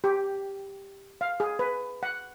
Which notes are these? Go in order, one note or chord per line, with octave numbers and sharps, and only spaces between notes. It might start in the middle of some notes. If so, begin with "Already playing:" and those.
G4
F5
G#4
B4
F#5